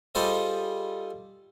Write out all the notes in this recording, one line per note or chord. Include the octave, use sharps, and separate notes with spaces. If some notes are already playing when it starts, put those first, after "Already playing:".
G3 F4 G#4 A4 C5 D#5